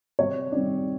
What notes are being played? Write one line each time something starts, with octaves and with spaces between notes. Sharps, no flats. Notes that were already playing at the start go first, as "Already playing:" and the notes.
C3 C#5
D#3 G3 C4 D5